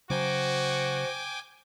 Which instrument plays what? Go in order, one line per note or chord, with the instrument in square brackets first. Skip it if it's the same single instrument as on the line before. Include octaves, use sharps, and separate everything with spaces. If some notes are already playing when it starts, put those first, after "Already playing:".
[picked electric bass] C#3 F#3 [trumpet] F#4 [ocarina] C5 [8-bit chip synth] G5 G#5 D6